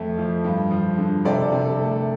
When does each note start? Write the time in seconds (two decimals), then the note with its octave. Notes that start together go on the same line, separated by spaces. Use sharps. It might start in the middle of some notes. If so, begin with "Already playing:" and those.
Already playing: F2 A3
0.18 F3
0.44 G2
0.71 F3
0.98 D3
1.25 C3 A4 D5
1.45 A4
1.52 C3
1.65 A4
1.79 A3
1.85 A4